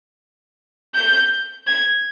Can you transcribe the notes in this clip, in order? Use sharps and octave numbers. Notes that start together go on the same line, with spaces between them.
G6
G#6